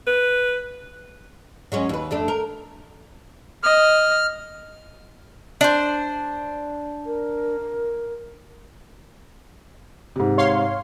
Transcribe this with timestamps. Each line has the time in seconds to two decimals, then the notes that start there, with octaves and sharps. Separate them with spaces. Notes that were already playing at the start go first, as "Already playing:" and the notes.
0.07 B4
1.72 F#3 G#3 C#4
1.89 D#2 B4
2.11 F2 A3 D4
2.28 A#4
3.63 D#5 F6
5.61 D4 C5
7.06 A#4
10.16 G#2 C3
10.38 C#5 F5 C6